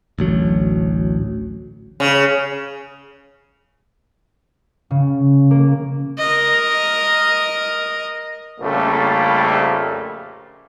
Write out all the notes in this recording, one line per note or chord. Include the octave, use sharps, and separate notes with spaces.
A1 D2 F#3
C#3
C#3
A#3
A#4 D#5
A#1 F2 C#3 G3 A3 A#3